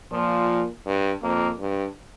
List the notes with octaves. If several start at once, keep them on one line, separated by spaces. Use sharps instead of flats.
A#2 F3
G2
F2 A#3
G2